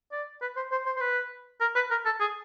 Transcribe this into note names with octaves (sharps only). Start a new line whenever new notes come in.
D5
B4
C5
C5
C5
C5
B4
A#4
B4
A#4
A4
G#4